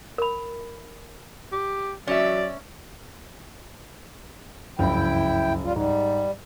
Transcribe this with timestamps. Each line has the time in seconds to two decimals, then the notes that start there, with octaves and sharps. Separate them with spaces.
0.18 A#4 B5
1.52 G4
2.07 F#3 C#4 D5 E5
4.79 F#1 C#2 G2 F3 E4 G5
5.64 G3 F4
5.76 G#2 G3